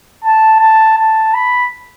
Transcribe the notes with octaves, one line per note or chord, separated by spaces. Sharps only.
A5
A5
A5
B5